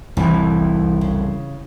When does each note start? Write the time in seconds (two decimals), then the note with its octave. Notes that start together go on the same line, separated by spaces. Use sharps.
0.17 C2 F2 A2 E3
1.01 C#3